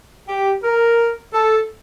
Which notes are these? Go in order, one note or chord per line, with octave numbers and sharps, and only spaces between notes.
G4
A#4
A4